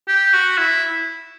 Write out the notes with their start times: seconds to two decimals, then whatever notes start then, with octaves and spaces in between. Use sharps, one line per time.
0.08 G4
0.33 F#4
0.58 E4